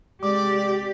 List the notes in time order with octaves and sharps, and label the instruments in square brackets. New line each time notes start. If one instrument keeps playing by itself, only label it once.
[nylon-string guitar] C3 G#3 [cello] G4 [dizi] D5 [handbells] D6